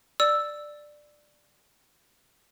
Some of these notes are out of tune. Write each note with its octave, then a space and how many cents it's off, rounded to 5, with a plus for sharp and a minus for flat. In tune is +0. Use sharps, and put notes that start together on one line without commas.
D5 +10 E6 +0